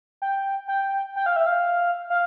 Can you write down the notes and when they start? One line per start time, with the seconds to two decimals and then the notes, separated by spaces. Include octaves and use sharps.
0.22 G5
0.68 G5
1.16 G5
1.26 F5
1.36 E5
1.46 F5
2.10 F5